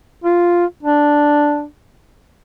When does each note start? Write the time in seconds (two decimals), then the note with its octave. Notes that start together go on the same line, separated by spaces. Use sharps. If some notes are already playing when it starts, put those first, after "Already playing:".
0.24 F4
0.83 D4